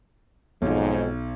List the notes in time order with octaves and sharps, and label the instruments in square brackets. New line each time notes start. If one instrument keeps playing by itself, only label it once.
[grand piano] B1 [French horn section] F2 G#2